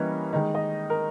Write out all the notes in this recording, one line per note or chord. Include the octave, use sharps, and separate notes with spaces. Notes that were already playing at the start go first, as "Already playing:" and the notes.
Already playing: E3 G3 A#3 C#4 B4 D#5
D#3 G#3 D#4
D#5
A#4